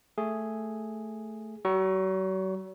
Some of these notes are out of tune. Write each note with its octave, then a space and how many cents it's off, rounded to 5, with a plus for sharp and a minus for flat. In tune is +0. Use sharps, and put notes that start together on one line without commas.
A3 +0 G#4 +0
F#3 +40 C#6 +0